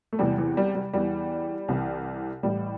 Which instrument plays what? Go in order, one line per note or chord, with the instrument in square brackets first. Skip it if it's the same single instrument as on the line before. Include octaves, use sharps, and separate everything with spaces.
[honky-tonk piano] A3
E2 C3 E3 G3
E3
G3
G3
E2 E3 G3
C2 C3 E3
A1 A2 E3 G3